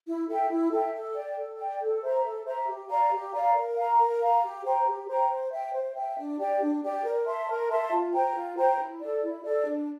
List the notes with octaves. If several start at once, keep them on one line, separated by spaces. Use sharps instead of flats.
E4
A4 E5 G5
E4
A4 E5 G5
A4
D5 G5
A4
D5 G5
A4
C5 E5 A#5
A4
C5 E5 A#5
G4
D5 F5 A#5
G4
D5 F5 A#5
A#4
F5 A#5
A#4
F5 A#5
G4
C5 G5 A#5
G4
C5 G5 A#5
C5
E5 G5
C5
E5 G5
D4
G4 D5 G5
D4
G4 D5 G5
A#4
E5 A5 C6
A#4
E5 A5 C6
F4
C5 G5 A#5
F4
C5 G5 A#5
E4
A4 D5
E4
A4 D5
D4